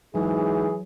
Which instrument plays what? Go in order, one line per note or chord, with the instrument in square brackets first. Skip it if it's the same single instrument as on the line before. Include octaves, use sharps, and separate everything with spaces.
[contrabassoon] G#2 [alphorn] E3 [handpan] F#3 [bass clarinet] G#4